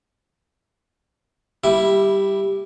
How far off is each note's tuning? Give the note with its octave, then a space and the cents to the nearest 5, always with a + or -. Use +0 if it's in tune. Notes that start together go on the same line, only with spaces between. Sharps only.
G3 +0 E4 +0 E5 +0